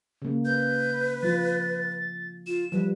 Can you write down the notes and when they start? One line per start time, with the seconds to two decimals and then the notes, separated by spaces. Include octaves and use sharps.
0.22 C#3 A#3
0.45 B4 G6
1.23 F3 F4 A6
2.47 F4 E7
2.72 F3 G3 B4